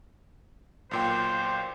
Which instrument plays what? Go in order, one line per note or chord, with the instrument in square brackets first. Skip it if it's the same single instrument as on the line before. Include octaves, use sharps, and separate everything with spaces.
[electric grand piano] B1 A#2 G5 [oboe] C5